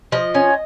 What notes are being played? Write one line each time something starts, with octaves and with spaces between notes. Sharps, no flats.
F3 D#5
C#4